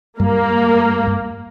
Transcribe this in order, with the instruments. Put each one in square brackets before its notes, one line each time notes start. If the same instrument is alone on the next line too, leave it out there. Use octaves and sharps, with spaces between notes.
[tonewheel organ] G2 [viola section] A#3